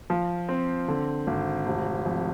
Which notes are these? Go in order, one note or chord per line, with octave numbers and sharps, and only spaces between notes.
F3
C4
D3
G#1
F1
F2